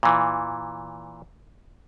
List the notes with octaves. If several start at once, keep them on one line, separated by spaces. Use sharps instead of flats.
A#2 E3